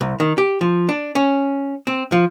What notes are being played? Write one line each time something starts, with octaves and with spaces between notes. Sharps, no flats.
C2
D#3
G4
F3
D4
C#4
C4
F3